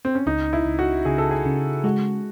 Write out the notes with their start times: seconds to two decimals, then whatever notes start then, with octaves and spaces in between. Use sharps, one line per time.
0.05 C4
0.15 C#4
0.26 C#2 D#4
0.53 E4
0.65 C#2
0.79 F#4
1.05 C#3 G#4
1.18 A4
1.31 G#4
1.45 C#3
1.84 G#3 F#4